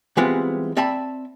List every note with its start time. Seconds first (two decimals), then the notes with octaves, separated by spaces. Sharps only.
0.17 E3 G3 G#3 B3 C4 F4
0.77 C4 D5 E5 A5 B5